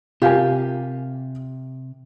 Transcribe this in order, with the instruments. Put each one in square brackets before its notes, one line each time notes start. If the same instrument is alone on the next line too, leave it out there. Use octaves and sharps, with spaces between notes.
[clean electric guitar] C3 [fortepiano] F4 F5 G#5 [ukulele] G4 A#4